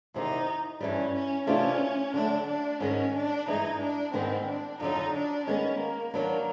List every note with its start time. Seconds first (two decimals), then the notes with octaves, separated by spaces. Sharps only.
0.14 E2 C3 D#3 D#4
0.80 G2 E3 G3 C#4
1.14 C#4
1.47 C3 E3 A3 C#4 D4 F4
2.14 D3 F#3 A3 D4
2.47 D4
2.80 G#2 D#3 G#3 C#4
3.14 D4
3.47 G2 E3 G#3 D#4
3.80 D4
4.13 G#2 D#3 G#3 B3 C4
4.47 D4
4.80 F2 D3 F#3 D#4
5.13 D4
5.46 D#3 G#3 B3 C#4
5.80 A#3
6.13 D#3 F#3 A#3 B3 D4